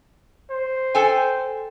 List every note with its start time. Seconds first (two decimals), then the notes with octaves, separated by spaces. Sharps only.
0.50 C5
0.95 A4 G5 G#5